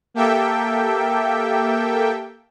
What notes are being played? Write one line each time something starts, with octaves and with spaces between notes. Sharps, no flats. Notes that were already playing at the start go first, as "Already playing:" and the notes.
A#3 G4 A4 E5 G5